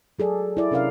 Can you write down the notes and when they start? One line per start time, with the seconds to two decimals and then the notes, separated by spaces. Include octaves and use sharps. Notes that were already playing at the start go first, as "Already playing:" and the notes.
0.19 F#3 G#4 A4 D5
0.57 E4 D5
0.71 C3 C#4 D4 A#4 D5 F5